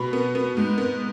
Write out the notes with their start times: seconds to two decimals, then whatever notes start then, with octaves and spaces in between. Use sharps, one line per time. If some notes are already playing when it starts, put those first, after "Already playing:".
Already playing: B2 B5
0.13 B3
0.35 B3
0.57 G#2
0.78 B3